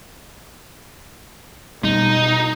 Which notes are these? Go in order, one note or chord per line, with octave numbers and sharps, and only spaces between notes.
B2 G3 D#4